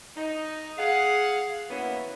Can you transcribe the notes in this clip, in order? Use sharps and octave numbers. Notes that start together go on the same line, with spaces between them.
D#4
G#4 F5 F#5
E3 A#3 B3 C#4 E4 F#4